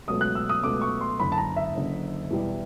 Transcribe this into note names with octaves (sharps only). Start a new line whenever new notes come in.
C#2 B2 F#3 A3 D#6
F#6
E6
D#6
C#2 B2 F#3 A3 D6
C#6
C6
F#1 F#2 D3 B5
A5
A#5
E5
F#1 F#2 D3
E2 B2 G3